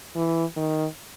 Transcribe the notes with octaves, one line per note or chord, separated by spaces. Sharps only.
E3
D#3